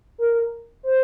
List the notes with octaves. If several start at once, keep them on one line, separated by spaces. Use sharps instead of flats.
A#4
C5